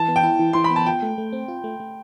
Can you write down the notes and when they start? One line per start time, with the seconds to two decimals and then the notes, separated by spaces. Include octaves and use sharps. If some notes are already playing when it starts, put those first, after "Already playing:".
Already playing: E3 A5
0.08 B3
0.16 G5
0.23 E4
0.39 E3
0.53 E3 C6
0.64 B5
0.70 B3
0.76 A5
0.86 F4 G5
1.02 A3
1.18 A3
1.32 C4
1.48 F4
1.64 A3
1.80 A3